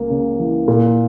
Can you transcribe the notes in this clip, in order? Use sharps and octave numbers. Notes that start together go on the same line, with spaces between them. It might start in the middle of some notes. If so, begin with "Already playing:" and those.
Already playing: C#2 A#3
C#3
E3
A#2